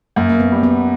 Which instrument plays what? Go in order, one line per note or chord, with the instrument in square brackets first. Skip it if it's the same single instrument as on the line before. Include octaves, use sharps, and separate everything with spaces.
[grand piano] F#2 [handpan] A#3
[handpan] A#3
B3
[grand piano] G3
[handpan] B3